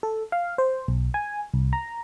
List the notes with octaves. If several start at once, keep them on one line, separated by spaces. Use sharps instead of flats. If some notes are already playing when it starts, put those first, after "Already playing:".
A4
F5
C5
B1
G#5
C2
A#5